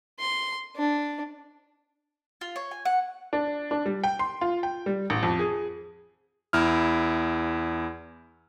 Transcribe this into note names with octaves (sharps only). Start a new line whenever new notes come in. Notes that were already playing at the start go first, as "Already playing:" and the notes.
C6
D4
F4
C#5
G#5
F#5
D4
D4
G3
G5
C6
F4
G5
G3
A1
F2
G#4
E2 E4 F6